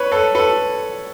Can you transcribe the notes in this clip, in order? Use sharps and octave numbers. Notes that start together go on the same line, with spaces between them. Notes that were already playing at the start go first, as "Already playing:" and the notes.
Already playing: B4 C#5
A4 B4
A4 B4